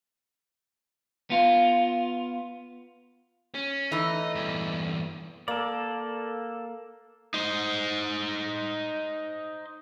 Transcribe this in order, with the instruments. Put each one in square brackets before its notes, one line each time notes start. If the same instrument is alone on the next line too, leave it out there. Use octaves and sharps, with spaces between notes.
[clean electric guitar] B3 F4
[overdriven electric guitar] C#4
[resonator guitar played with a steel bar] E3 A3 D#4 [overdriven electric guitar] D#5
[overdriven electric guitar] E2 G2
[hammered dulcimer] A#3 [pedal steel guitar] A4 D5
[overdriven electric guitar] D#4 C5